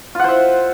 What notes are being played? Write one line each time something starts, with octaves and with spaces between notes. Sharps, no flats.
F4 C5 E5 F#5